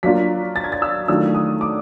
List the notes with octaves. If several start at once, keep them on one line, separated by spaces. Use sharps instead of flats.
F#3 A#3 D4 F4 B6
A6
G#6
A6
E6
D#3 F#3 A3 D4 F4 E6
D#6
D6